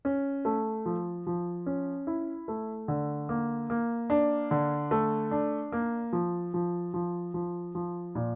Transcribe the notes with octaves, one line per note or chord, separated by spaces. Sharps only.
C#4
A3
F3
F3
C#4
E4
A3
D3
A#3
A#3
D4
D3
A3
D4
A#3
F3
F3
F3
F3
F3
A#2